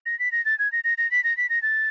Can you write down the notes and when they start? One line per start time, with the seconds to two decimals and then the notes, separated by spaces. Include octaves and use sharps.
0.06 A#6
0.19 B6
0.32 A#6
0.45 A6
0.59 G#6
0.72 A#6
0.84 A#6
0.98 A#6
1.11 B6
1.24 A#6
1.37 B6
1.50 A#6
1.62 A6